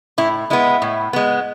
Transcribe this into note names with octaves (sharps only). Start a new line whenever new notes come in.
A2 E4
G#3 B3 E4
A2
G#3 B3